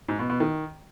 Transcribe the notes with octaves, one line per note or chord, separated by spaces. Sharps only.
G#2
B2
B2
D#3